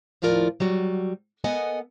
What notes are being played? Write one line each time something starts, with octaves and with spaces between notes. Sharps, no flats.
D#2 A2 F3 F4 A#4 D5
F#3 G3 F#4
B3 A4 A#4 D#5 F#5 G#5